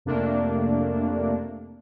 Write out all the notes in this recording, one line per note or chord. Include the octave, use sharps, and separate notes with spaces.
F2 C3 A3 A#3 D4